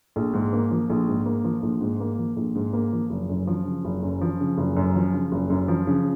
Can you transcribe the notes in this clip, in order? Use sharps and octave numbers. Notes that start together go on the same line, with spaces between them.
A#1
G#2
A#3
F3
A#1
G#2
A#3
F3
A#1
G#2
A#3
F3
A#1
G#2
A#3
F3
F#1
F#2
F3
C#3
F#1
F#2
F3
C#3
F#1
F#2
F3
C#3
F#1
F#2
F3
C#3